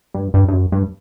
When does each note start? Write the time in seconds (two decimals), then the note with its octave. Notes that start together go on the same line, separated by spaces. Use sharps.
0.14 G2
0.34 G2
0.48 G2
0.53 F#2
0.72 G2